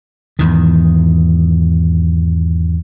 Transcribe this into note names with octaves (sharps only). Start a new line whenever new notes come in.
E2 G#2 D#3